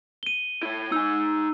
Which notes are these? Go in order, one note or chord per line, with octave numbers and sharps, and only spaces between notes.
D#7 G7
E4 C#5
D#4 G#5 E6